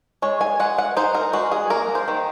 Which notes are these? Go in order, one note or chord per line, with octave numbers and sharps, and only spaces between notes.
G#3 C#5
G#5
G#3 F#5
F#5
D#4 C5
A#4
G#3 F#4
G#4
A#3 A#4
C5
D#3